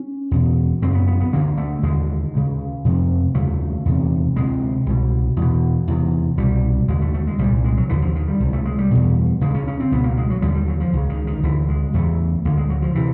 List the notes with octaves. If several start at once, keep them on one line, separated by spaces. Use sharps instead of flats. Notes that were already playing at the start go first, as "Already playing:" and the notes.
Already playing: C#4
E2 B2
F#2 C#3 C4
B3
B3
B3
D2 D3 A#3
A3
D#2 D3 G#3
D2 C#3
F2 C3
D#2 C#3 A3
E2 C3
D2 C3 G#3
C2 B2
E2 B2
E2 C3
C2 B2 G3
D#2 D3 G#3
A3
A3
G#3
C2 A#2 G3
G#3
F#3
D#2 D3 E3
F3
D#3
G3
C#2 C3
A3
G#3
G3
E2 B2
D2 C#3 G#3
C#4
C#4
C4
C#2 B2 B3
A#3
G#3
F#3
D#2 D3 G3
G3
F#3
F3
C#2 C#3
D#3
D#3
D2 D3 E3
G#3
E2 C#3 A3
D2 D3 A#3
G#3
F#3
F3
C3 E3